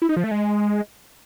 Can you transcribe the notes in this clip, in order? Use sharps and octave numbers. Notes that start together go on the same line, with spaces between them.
E4
D#4
F3
A3
G#3